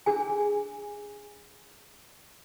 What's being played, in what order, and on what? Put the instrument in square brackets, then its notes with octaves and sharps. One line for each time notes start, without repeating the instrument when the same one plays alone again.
[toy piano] D4 G#4 G#5